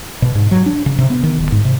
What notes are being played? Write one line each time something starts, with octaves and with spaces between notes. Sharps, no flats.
B2
G#2
F#3
D4
C#3
C3
B3
D#3
D1
G#2
C3